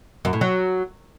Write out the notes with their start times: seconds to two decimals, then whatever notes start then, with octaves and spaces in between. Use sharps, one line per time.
0.25 F#2
0.33 A2
0.41 F#3